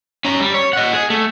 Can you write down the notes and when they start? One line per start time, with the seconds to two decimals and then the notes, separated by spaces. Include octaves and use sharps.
0.25 C#4 A#5
0.40 G3
0.54 C#5
0.73 D#5 F#5
0.93 G#4
1.10 A3